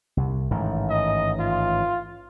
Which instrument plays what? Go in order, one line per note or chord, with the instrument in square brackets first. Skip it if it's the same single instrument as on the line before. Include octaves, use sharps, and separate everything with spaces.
[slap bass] C2
A1 G#2 D#3
[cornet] D#5
F4